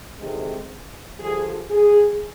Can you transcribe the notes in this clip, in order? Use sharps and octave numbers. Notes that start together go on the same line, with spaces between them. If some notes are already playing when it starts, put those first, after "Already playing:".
D2 C3 D#3 G#3
G2 D3 F3 G#4
G#4